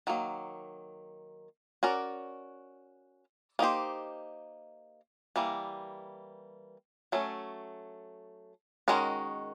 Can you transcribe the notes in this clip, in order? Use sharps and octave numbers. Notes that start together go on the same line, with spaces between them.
D#3 F#3 A#3
C#4 F#4 A#4 D5
A#3 D#4 G4 C5
E3 G3 A#3
F#3 A3 C#4
D#3 G#3 C#4 F#4 A#4